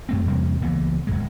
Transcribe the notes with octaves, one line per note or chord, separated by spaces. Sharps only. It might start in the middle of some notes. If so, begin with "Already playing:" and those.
F#2 A3 C4
E2 C3 G3 A#3
C#2 E3 A#3 B3
D1 E2 G#3